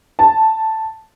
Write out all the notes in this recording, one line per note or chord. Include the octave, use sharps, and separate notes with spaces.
A5